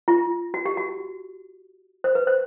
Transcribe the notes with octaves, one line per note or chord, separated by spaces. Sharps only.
F4
F#4
G4
F#4
C5
B4
C5